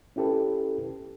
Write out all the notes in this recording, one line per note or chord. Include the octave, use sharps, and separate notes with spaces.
C#4 E4 G4 A4 B4